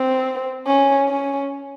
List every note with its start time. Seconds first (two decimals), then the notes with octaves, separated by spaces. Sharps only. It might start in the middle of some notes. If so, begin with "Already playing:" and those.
Already playing: C4
0.67 C#4
1.08 C#4